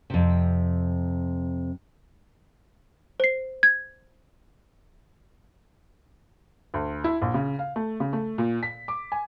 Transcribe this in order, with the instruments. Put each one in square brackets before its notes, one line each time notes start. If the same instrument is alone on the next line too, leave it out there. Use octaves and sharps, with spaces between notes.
[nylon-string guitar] F2 C3
[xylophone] C5 C7
G#6
[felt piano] D2
E4
A#1
C#3
F5
A3
C#3
A3
A#2
B6
D6
G#5